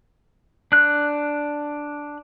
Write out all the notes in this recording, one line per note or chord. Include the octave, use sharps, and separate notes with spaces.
D4 F#6